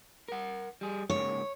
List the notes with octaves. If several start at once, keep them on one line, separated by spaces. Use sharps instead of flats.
A#4 F#5
G3 G#4
G#2 C#3 A#3 C#5